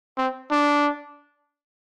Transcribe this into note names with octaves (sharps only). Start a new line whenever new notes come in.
C4
D4